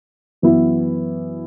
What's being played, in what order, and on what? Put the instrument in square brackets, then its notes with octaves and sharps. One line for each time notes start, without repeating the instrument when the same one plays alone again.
[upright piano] F#2 E3 B3 E4